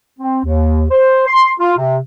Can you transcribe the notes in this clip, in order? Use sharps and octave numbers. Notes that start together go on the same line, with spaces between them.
C4
D#2
C5
C6
F4
C3